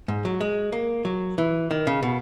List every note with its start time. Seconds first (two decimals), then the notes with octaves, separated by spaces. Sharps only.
0.08 G#2
0.25 F#3
0.40 G#3
0.72 A#3
1.05 F#3
1.38 E3
1.71 D#3
1.87 C#3
2.03 B2